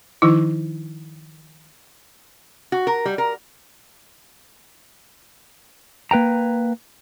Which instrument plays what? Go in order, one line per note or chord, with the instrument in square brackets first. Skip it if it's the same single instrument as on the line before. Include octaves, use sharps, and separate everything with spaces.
[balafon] D#3 F3 D#4 E4
[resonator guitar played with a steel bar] F#4
A#4
G3
A#4
[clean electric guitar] A#3 B4 G5 A#5